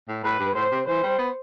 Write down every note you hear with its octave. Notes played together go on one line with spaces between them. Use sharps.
A2
A2 B4
G2
A2 C5
C3
E3 C5
G3
B3